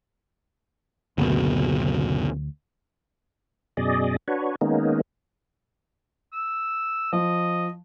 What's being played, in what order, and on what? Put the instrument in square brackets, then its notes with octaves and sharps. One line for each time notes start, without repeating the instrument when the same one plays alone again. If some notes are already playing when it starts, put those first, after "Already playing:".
[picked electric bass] F#1 B2 [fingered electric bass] D2
[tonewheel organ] F#2 B2 G#4 D5 D#5
D4 F#4 B4 C#5
D#3 G#3 A#3 B3 C#4 D#4
[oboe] E6
[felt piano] F3 [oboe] D#5